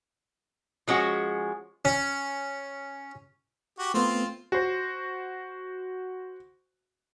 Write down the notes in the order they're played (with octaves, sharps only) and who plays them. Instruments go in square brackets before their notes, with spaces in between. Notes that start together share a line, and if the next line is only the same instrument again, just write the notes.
[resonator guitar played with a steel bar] F3 G#3 C#4 F#4
[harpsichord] C#4
[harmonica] F#4 G4
[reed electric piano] A3 B3 [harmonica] C4 F4
[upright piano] F#4 C5